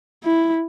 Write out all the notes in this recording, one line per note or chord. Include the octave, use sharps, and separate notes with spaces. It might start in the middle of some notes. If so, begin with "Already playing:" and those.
E4